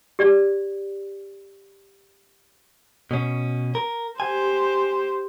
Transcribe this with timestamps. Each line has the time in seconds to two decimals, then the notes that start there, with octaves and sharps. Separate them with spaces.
0.19 G4 D5
3.11 B2 C#4
3.75 A#4
4.20 G4 C5 G#5